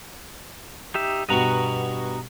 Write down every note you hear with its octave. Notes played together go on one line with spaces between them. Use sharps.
D#4 G4 E5
G2 B2 F#4 D#5 F#5 A#5